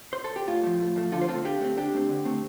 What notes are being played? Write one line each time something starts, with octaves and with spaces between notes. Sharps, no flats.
C5
A4
G4
A2 F4
F3 A3
A2
F3 A3
D3 F4 A4
C5
A3 C4 F4 A4
D3 D4 G4
A3 C4
D3 D4 G4
A3 C4
D3
A3 C4